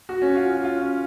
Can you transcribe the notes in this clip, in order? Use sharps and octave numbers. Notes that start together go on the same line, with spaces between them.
F#4
C#4
F4
F#4
F4
C#4